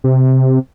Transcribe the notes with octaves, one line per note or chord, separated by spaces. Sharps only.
C3